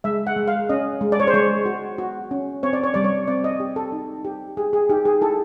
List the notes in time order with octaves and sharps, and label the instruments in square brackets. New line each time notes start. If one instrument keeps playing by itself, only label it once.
[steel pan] G#3 E5
F#5
G#3
F5
C#4 D#5
G#3
D5
C#5
C5
G#3 C#5
F#4
F#4
C#4
C4 C#5
D5
C#5
G3 D5
C#5
C4 D5
D#5
G4
A4
D#4
G4
G4 G#4
G#4
D#4 G4
G#4
E4 A4